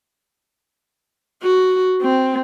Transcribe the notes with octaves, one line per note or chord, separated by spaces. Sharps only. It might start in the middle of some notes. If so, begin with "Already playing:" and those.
F#4
C4